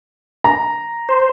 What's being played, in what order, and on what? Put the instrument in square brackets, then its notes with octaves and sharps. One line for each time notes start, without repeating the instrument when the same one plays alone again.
[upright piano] A#5
[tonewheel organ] C5